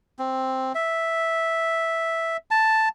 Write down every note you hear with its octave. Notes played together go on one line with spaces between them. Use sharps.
C4
E5
A5